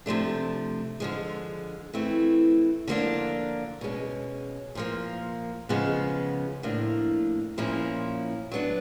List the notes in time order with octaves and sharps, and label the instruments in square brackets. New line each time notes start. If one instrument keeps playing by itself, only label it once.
[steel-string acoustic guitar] C3 F3 A3 D4
D3 F3 G#3
E3 A3 C4 E4
D3 F3 A#3 D4
B2 G#3 C#4
A#2 F3 A#3
C#3 F3 G#3 B3
A2 F3 A#3 D4
A#2 F3 A#3 C#4 E4
F#3 B3 D4